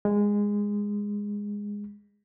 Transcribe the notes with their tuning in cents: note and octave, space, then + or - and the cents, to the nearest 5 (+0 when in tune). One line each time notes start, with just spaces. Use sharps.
G#3 -15